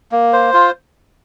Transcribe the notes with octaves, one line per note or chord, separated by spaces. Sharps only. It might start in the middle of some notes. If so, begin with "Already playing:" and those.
A#3
C5
F4